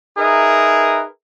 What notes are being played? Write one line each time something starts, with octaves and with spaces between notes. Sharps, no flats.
D#4 G#4 A#4 B4 E5